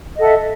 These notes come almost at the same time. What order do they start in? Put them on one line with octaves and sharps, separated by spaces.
D#5 A4 F#5 E5